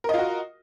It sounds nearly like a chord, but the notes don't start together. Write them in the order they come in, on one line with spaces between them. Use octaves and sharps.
A#4 D#5 F4 F#4